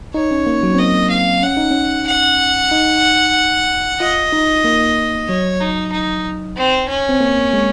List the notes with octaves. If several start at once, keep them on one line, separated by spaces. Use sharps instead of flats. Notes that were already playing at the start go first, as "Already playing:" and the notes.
D#4 C#5
C#4
A#3
F#3
C4
A#3 D#5
C4 F5
C#4 F#5
D#4
C#4
F#5
D#4
F4 D#5
D#4
A#3
F#3 C#5
D#4
D#4
C4
C#4
C4
A#3
G#3